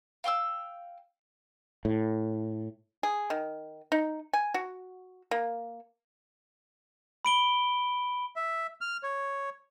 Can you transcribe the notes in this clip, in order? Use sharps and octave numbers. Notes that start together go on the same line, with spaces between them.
F5 G5 D6 E6
A2
G#4
D#3
D#4
G#5
F#4
A#3
B5 D7 G7
E5
F6
C#5